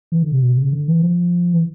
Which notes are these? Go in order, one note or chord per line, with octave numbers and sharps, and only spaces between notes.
E3
D3
C3
B2
C#3
D3
E3
F3
E3